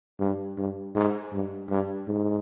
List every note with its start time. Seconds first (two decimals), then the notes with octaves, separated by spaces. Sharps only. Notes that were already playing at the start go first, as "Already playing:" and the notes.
0.20 G2
0.58 G2
0.95 G#2
1.33 G2
1.70 G2
2.08 G#2